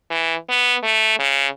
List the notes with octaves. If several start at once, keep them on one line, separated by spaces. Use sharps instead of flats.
E3
B3
A3
C#3